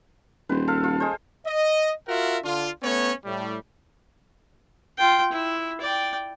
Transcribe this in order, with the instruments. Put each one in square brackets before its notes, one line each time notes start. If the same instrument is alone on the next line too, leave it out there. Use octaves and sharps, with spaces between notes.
[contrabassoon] D#1 [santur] B4 C5
[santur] A4 F5
F4
G#3 C5
[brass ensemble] D#5
F4 F#4 A#4 E5 F#5
D3 D4 F4
A3 B3 C#4 C#5
A2 G3
[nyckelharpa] F4 G5
E4
D5 G5